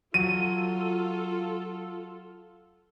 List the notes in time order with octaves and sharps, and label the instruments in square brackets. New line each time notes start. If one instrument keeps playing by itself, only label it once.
[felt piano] F#3 [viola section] F4 A4 [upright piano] D#7